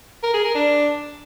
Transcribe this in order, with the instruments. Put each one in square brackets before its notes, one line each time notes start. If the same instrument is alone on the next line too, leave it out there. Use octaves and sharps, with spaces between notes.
[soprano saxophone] A#4
G#4
A#4
D4